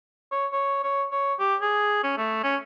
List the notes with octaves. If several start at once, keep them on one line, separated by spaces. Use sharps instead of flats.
C#5
C#5
C#5
C#5
G4
G#4
C#4
A3
C#4